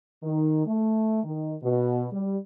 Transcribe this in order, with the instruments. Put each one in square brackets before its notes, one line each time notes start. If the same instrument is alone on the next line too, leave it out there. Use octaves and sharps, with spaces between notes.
[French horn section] D#3
A3
D#3
B2
G3